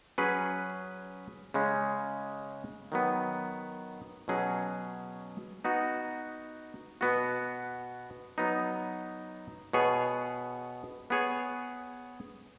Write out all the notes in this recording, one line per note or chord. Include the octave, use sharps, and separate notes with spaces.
F#3 C#4 G#4 B4
C#3 G#3 C#4
D#3 F#3 B3
B2 F#3 C#4 G#4
B3 D#4 F#4
B2 B3 F#4
F#3 B3 D#4
B2 B3 G#4 C#5
B3 G#4 C#5